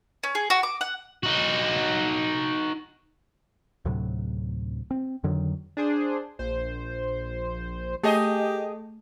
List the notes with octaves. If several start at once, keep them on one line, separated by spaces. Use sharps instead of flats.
C#4
G#4
F#4
D6
F#5
D#4 F#4
D2 A2 C3 F#3
C4
F2 D3 D#3 F#3
D4 G#4 C5
A#1 C5
A3 G4 G#4 D#5